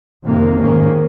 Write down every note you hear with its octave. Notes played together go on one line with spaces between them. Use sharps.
F2 C3 D#3 A#3
G#2 D#3 A#3 C#4